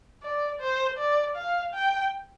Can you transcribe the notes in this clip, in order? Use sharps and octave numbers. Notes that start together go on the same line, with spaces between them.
D5
C5
D5
F5
G5